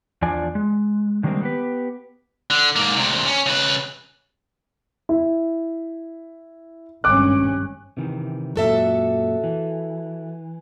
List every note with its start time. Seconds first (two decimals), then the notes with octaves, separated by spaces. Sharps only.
0.22 E2 F3 D4 D5 G#5
0.55 G#3
1.23 D3 D#3 G3 G#3 A#3 C4
1.41 B3 G4 B4
2.50 D3
2.76 G#2 A#3
2.96 D2 C3
3.27 C#4
3.46 C#3 B4
5.09 E4
7.04 G#1 G2 C#4 D6 F#6
7.97 C3 D#3 E3
8.56 F#2 A#2 F#4 A4 E5
9.44 E3